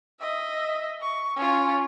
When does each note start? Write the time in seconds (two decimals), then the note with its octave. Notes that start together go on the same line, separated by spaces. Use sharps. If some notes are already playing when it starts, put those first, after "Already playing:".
0.21 D#5 E5
1.01 C#6
1.36 C#4 F4